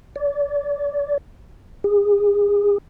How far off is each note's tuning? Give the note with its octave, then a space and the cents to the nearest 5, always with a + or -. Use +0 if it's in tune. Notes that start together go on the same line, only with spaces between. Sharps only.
D5 -35
G#4 -30